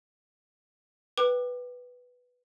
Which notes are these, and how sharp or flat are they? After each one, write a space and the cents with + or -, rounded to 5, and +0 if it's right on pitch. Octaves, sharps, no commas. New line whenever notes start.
B4 +0 G5 +0 D6 +30